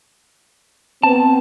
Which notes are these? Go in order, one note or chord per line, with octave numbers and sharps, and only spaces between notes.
B3 C4 A5